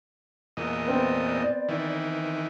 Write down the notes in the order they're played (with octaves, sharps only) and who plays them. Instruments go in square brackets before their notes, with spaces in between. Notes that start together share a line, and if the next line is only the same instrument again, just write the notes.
[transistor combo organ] E2 A#2 D#5
[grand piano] B3 C4 [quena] D5
[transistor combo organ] D#3 E3